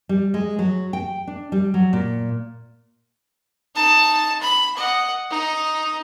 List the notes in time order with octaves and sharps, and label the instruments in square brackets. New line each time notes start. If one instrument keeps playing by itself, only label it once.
[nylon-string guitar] G3
G#3
F#3
G5
D4
G3
F#3
A#2
[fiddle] D#4 A5
B5
D#5 F#5
D#4